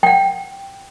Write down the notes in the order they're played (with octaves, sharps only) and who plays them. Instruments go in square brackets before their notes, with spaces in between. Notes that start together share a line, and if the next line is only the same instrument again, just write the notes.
[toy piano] F#5 G5